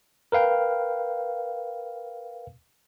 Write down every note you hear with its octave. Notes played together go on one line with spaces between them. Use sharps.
A#4 B4 F5 G5